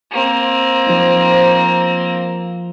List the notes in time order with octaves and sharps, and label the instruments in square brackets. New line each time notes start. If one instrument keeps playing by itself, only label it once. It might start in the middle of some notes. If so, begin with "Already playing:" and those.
[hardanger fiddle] A#3 C4
[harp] F3 D#4